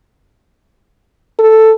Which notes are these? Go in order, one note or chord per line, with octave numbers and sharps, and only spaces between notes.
A4